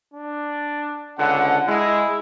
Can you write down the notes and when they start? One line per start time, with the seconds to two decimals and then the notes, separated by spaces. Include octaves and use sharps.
0.14 D4
1.19 C#2 D3 F#5
1.68 G#3 E4